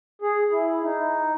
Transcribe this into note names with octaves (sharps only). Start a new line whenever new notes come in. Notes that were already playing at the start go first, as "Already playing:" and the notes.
G#4
E4
D#4